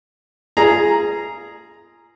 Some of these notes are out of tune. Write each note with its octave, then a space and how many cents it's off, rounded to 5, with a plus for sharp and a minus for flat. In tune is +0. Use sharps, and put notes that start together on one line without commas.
F4 -35 G#4 +0 A#5 +0